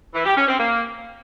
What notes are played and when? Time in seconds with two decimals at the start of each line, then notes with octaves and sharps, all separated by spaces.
0.14 E3
0.25 G4
0.36 C#4
0.48 C4
0.59 A#3